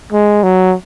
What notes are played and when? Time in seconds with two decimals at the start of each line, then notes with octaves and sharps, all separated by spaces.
0.12 G#3
0.43 F#3